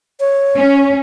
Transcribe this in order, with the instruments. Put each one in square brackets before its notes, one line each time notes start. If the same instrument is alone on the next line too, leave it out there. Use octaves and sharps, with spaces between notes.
[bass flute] C#5
[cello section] C#4